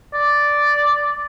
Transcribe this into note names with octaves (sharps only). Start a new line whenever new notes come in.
D5